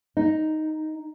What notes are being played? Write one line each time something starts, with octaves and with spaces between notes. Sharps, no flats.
D#4